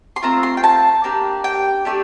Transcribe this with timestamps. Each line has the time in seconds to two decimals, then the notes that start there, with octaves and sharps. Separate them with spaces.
0.16 C6
0.22 A3 C4 F4 A#5
0.43 C6
0.57 G5
0.64 A5
1.04 A#3 D4 G4
1.44 G5
1.85 A3 D4 G4